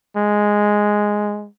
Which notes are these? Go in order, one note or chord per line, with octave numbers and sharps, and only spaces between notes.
G#3